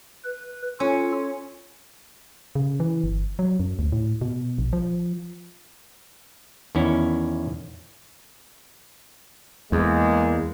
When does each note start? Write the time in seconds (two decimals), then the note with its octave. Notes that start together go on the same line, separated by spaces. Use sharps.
0.24 B4
0.80 C#4 F4 A4
2.55 C#3
2.80 E3
3.04 G1
3.39 F#3
3.60 F#2
3.79 D2
3.92 A2
4.21 B2
4.59 A#1
4.73 F3
6.75 E2 D#3 C#4 E4
9.72 E2 G#3 A#3